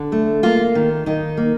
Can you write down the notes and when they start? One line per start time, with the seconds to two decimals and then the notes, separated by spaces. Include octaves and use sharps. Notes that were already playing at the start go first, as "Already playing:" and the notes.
Already playing: D3
0.12 A3
0.43 A#3 F4
0.75 D#3
1.06 D#3 D#4
1.37 A#3